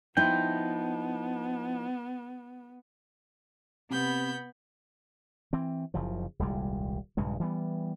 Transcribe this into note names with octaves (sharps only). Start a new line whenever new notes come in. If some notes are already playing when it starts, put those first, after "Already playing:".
F3 B3 D#4 E4 G5
C3 B3 B5 G6
E3 C4
F#1 C#3 F3
D#1 C2 G3 G#3
A#1 G2 C#3 G#3
E3 G3 B3